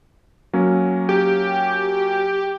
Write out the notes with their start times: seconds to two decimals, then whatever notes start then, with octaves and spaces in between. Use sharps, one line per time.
0.53 F#3 A#3 C#4
1.09 G4